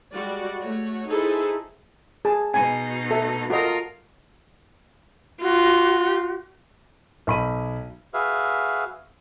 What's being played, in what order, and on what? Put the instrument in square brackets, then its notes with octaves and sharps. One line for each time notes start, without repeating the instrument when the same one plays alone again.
[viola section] G3 G#3 F#4 D5
A3 F#4 C#5
D#4 E4 G#4 A4 B4 C5
[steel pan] G#4 A5
[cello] B2 D#4 [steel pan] G#5
[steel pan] A4 E5
[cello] F4 A#4 [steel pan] F#4 A4 D#5
[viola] F4 [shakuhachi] F#4
[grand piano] B1 B5 D#7
[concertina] F#4 G#4 B4 E5 F5